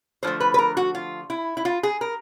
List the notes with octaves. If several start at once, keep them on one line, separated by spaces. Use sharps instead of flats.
D3 F3 A3 C5
B4
B4
A#4
F#4
F4
E4
E4
F4
G#4
A#4